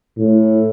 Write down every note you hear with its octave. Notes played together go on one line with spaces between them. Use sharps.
A2